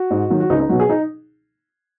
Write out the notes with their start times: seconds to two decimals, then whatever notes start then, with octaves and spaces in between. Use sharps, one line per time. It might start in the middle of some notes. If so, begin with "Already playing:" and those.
Already playing: F#4
0.10 G#2
0.30 D#3 F#3
0.40 F#4
0.50 C#2 D#4
0.60 D#4
0.69 B2 F#3 F#4
0.80 G#4
0.89 D#4